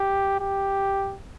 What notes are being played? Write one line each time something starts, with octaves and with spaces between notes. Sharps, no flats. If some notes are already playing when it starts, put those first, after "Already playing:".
Already playing: G4
G4